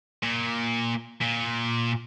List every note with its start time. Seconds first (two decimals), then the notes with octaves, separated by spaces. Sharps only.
0.23 A#2
1.21 A#2